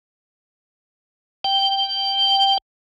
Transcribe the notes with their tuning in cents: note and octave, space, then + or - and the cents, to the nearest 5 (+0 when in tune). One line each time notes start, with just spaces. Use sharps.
G5 +0